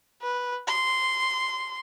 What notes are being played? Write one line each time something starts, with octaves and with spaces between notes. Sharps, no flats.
B4
C6